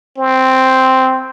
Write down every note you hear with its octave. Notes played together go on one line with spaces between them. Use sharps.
C4